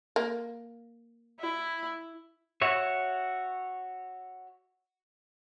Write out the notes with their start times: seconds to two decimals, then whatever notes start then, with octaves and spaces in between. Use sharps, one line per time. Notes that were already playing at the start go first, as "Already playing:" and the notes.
0.16 A#3
1.41 E4
2.62 F#4 C#5 E5